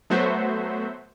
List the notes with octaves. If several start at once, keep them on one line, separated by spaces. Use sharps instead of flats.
F#3 A3 B3 F#4 C5 E5